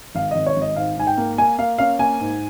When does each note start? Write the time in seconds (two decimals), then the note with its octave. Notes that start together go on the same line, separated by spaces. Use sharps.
0.15 G#1 F5
0.31 G#1 D#5
0.46 C#5
0.56 G#1
0.62 D#5
0.76 G#2 F5
0.97 G#2 G#5
1.07 G5
1.17 A#3
1.38 A#3 G#5
1.58 A#3 F5
1.78 C#4 F5
1.99 A#3 G#5
2.21 G#2